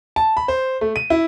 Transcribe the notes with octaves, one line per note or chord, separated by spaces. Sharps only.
A5
B5
C5
A3
D#7
E4